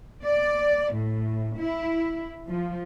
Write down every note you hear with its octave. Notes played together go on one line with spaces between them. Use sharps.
D5
A2
E4
F3